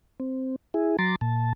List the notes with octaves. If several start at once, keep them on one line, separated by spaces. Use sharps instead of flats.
C4
E4 G#4
F#3 A#5 C6 D6 A6
A#2 A5